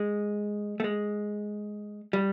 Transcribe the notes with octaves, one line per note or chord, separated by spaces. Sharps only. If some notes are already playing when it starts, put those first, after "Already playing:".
Already playing: G#3
A3
G#3
G3